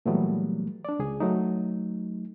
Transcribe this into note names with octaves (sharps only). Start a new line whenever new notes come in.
A#2 E3 F#3 G3 A3 B3
D4 D5
C#2 G#4
F#3 A3 D#4